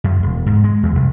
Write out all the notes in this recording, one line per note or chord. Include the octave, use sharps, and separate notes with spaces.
F#2
E1
G#2
G#3
E2
C2